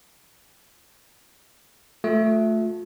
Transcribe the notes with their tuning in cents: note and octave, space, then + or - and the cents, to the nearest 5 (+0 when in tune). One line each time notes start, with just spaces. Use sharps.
A3 +0 F4 +35